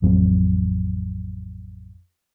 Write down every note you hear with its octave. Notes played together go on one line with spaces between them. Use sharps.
A1 F2 F#3 C4